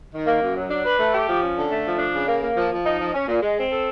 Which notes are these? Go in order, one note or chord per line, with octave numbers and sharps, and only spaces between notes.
D#3
A#3
F#2
F#3
D4
B4
A3
G4
F3
C#4
D3
A3
F3
D4
C#3
A#3
A#3
F3
F3
D#4
F3
C#4
A#2
G#3
C4
A4